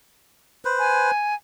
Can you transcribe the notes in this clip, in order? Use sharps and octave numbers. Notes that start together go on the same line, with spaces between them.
B4 C5
G#5